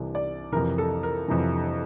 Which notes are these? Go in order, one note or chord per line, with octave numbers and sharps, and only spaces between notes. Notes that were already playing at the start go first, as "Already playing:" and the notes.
Already playing: C2 C3 E3
D5
F2 C3 E3 A#4
A4
A#4
F2 C3 E3